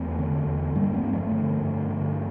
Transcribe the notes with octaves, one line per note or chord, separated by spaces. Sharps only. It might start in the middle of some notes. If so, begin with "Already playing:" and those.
Already playing: E2 A3 C4
D3
E2
G2 G3 A#3
A3 C4
G2
F3 A3
D3
G2
D3